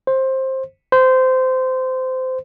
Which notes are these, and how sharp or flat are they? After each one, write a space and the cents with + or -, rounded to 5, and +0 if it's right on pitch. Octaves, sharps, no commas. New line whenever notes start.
C5 +15
C5 -20